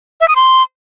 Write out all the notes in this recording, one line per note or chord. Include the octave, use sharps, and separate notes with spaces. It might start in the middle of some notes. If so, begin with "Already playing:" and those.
E5
D#6
C6